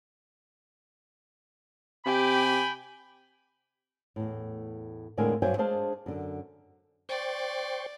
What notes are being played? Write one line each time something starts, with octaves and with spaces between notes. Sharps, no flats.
C3 G4 G5 G#5 B5
E2 A2
F2 A2 D3 G#3 A#4 G#5
G2 F#3 C5 G5 G#5
G#3 D4 G#4 C5 F5 A5
F#2 D3
C5 D5 G5 C#6